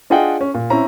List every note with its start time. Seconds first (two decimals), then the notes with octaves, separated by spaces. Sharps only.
0.10 D4 F4 G#4 D#5 F#5 G5
0.41 C#4
0.54 A#2
0.70 C4 C#4 E4 A#5